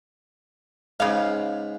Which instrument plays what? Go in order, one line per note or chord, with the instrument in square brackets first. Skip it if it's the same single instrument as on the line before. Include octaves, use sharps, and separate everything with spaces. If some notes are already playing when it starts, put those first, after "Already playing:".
[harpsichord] G#2 [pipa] C#3 F5